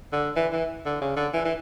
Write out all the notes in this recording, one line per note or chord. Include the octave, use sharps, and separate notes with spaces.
D3
E3
E3
D3
C#3
D3
E3
E3